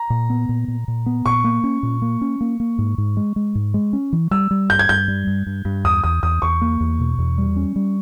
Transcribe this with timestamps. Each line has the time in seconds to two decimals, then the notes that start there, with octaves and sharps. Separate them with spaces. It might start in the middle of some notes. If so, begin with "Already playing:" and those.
Already playing: A#5
0.10 A#2
0.30 B3
0.49 A#2
0.68 A#2
0.88 A#2
1.06 B3
1.26 A#2 C#6
1.44 A#3
1.64 C#4
1.83 A#2
2.02 A#3
2.21 C#4
2.41 A#3
2.60 A#3
2.78 G#2
2.98 G#2
3.17 G#3
3.36 G#3
3.55 G#2
3.74 G#3
3.93 C#4
4.13 E3
4.31 G3 E6
4.51 G3
4.70 G2 G6
4.79 G#6
4.89 G2 G6
5.08 G3
5.27 G2
5.46 G2
5.65 G2
5.84 E2 D#6
6.04 E2 D#6
6.23 E2 D#6
6.42 E2 C#6
6.61 A#3
6.80 E2
7.00 B2
7.18 E2
7.38 G3
7.56 C#4
7.76 G3